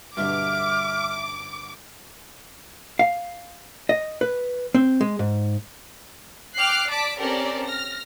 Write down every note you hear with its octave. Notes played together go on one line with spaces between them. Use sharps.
G2 B2 D3 E5 D6 F6
F5
D#5
B4
C4
G#3
G#2
G5 D6 F6 F#6 C7
D5 A5 D6 B6 D7
C4 C#4 G4 A4 A#4 D5
F6 A#6